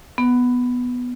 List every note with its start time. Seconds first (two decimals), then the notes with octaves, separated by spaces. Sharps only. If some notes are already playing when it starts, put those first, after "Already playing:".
0.18 B3